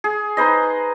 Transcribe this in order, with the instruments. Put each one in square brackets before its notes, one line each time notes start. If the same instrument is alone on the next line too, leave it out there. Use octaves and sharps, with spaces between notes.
[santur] G#4
D#4 B4 C5 D#5